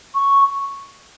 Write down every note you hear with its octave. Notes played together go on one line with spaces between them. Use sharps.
C#6